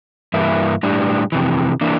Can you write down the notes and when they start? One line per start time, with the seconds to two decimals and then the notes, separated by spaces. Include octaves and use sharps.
0.34 G2 E3 A#3 E4
0.83 A2 G3 D4
1.32 F2 C3 E3
1.81 E3 A#3 D4